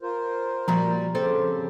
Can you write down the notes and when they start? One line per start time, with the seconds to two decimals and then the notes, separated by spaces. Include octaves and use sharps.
0.02 F4 A#4 C5
0.68 A#2 F3 G3 F#4 A#5
1.15 C#3 C4 G4 A4 C5